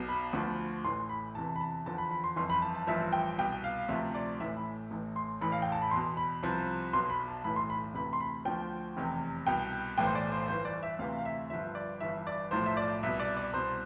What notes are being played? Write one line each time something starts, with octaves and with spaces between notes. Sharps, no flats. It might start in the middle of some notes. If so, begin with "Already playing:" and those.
Already playing: B1 B2
B5
D2 D3 F3
A1 A2 E3 C6
B5
E2 C3 E3 A5
B5
A5
E2 D3 F3 A5
B5
B5
C6
G1 F2 E3 C6
B5
A5
A5
A1 G2 F3 E5
G5
C2 B2 G5
F5
D2 C3 F3 E5
D5
A1 A2 E3 E5
B5
A1 A2 E3
C6
A1 A2 E3 B5
F5
G5
A5
B5
E2 B2 C6
B5
C2 C3 F3
B1 B2 C6
B5
A5
B1 A2 E3 B5
C6
B5
D2 C3 E3 B5
C6
B5
D2 D3 F3 G5
F1 E2 C3
C2 B2 G5
B1 A2 E3 G5
C5
D5
C5
G1 G2 E3 C5
D5
E5
D2 C3 E3 F5
F5
E5
G1 G2 D3 F3 E5
D5
G1 G2 E3 E5
D5
B1 A2 F3 C5
E5
D5
C2 B2 E5
D5
D5
C2 B2 C5